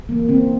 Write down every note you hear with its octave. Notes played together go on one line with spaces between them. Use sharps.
E3 A#3
C#3 C4